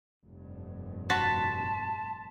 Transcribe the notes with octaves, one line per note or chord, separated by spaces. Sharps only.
F1 G2 A#2
F#4 A5 C6 A6 B6